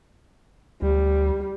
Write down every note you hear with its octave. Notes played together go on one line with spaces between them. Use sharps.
D2 G3